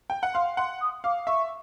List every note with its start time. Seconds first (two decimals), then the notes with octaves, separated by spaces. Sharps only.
0.10 G5
0.23 F#5
0.34 F5 C6
0.57 F#5 C6
0.81 D#6
1.04 F5 D6
1.27 E5 C#6